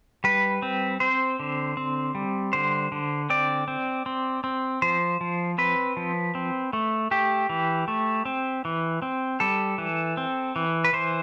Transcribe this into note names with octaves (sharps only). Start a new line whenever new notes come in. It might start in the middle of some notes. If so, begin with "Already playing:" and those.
G3 B4
C4
C4 C5
D3
C4
G3
D3 C5
D3
C4 D5
C4
C4
C4
F3 C5
F3
C4 B4
F3
C4
A3
A3 G4
E3
A3
C4
E3
C4
G3 A4
E3
C4
E3
B4
E3 C5